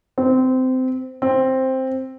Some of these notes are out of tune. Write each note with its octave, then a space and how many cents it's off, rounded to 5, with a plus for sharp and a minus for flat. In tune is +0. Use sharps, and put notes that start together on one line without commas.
C4 -20
C4 +5